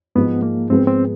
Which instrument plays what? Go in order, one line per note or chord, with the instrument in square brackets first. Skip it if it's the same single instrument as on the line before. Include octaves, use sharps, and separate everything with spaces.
[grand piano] G#2 F3 G#3 [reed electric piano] B3
[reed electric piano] A#3
[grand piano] G#2 F3 G#3 B3 [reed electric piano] C4
[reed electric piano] C4